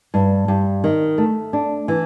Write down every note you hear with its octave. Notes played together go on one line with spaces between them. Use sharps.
G2
G2
D#3
A3
D4
E3